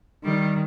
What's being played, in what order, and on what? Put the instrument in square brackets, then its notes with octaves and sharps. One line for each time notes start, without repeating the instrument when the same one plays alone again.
[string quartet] D#3 [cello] G3